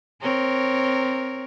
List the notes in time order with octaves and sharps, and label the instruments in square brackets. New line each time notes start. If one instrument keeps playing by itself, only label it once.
[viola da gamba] C4 A#4 C#5